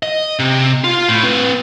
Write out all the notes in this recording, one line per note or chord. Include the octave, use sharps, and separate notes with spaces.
D#5
C3
F4
A2
C4 B4